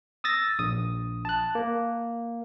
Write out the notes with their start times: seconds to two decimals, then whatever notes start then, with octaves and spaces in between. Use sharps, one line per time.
0.24 D#6 E6 A6 A#6
0.59 A#1 D#6
1.25 A5 F#6
1.55 A#3